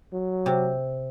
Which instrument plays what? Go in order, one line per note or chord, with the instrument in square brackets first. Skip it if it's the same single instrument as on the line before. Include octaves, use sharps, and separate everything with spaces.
[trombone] F#3
[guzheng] C3